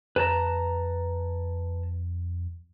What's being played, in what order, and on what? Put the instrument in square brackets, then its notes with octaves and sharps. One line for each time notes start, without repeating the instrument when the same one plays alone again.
[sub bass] F2 [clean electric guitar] B4 A5 A#5